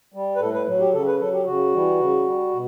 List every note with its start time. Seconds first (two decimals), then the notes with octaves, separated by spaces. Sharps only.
0.14 G3
0.36 B4
0.40 A2 A4
0.53 B4
0.67 F#3
0.80 G4
0.93 C#3 A4
1.06 B4
1.20 F#3 A4
1.33 G4
1.46 C#3 F#4
1.73 E3 G3
2.00 C#3
2.26 G3
2.52 B2